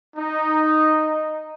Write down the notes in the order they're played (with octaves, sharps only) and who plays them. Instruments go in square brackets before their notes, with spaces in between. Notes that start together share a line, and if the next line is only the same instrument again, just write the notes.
[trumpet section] D#4